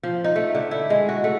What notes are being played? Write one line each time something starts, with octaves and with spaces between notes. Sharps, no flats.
F3
D#4
A3
D3
E4
G#3
F#4
A3